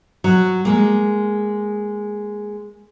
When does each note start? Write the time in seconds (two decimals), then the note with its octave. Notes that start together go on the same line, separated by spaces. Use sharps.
0.24 F#3
0.65 G#3 A#3